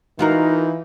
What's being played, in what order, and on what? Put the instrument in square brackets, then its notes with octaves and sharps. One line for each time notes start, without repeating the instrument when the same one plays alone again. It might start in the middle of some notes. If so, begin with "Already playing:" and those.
[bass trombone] E3 [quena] D#4 [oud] F4 F#4 A#4